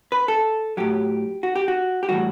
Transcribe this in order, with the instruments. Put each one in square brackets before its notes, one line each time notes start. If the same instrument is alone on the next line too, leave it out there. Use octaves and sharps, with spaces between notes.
[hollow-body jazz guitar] B4
A4
A2 F#3 G4
F#4
G4
F#4
G4
A2 E3 G3 F#4